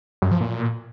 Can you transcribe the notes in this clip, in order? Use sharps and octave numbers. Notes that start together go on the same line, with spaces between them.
F#2
F3
A#2